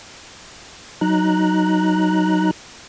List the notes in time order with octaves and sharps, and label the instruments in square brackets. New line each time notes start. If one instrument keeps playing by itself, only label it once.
[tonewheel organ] F#3 D#4 A#5 F#6